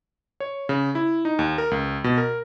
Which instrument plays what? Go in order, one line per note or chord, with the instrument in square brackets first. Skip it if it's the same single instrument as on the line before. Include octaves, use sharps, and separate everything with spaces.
[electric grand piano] C#5
C#3
E4
D#4
D#2
A#4
C#2
B2
A#4